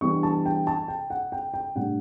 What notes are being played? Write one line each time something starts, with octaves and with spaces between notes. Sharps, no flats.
E3 G3 B3 D4 C#6
A5
G5
A5
G5
F#5
G5
G5
A2 G3 D4 F#5